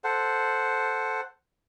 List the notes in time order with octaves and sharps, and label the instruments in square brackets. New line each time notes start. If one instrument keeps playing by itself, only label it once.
[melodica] A4 C5 F#5